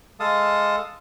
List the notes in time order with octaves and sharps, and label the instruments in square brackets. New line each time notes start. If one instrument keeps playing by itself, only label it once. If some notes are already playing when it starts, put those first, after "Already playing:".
[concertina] G#3 A4 F5 A5 D#6